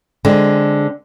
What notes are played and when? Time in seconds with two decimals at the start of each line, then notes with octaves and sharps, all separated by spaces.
0.25 D3 G#3 C4